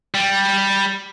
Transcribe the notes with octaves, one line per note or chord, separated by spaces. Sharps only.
G3